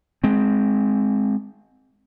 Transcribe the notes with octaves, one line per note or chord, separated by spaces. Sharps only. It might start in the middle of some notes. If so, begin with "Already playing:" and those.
G#3 C4